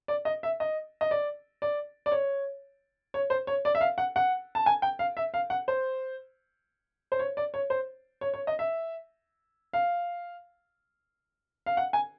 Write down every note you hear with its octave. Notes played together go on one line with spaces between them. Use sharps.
D5
D#5
E5
D#5
D#5
D5
D5
D5
C#5
C#5
C5
C#5
D5
E5
F5
F#5
F#5
A5
G#5
G5
F5
E5
F5
F#5
C5
C5
C#5
D5
C#5
C5
C#5
C#5
D#5
E5
F5
F5
F#5
G#5